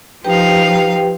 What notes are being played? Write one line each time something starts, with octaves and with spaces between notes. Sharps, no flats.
F3 D#4 G4 B4 F5 G5